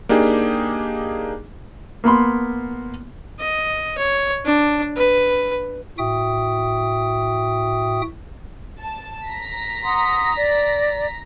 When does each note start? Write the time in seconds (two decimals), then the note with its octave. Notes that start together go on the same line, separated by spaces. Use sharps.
0.09 A#3 D4 D#4 G4 G#4
2.04 A#3 B3 B5 C6
3.40 D#5
3.98 C#5
4.45 D4
4.97 B4
5.98 A2 F#4 E5 G5 D#6
8.80 A5
9.28 A#5 A#6 B6
9.84 F#5 C6 D#6
10.36 D5